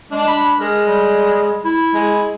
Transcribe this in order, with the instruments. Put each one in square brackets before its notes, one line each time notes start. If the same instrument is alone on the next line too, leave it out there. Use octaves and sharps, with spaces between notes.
[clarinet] G#3 [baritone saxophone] D4
[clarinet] B5
[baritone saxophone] G#3 [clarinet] A#4
[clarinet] G3
E4
[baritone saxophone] G#3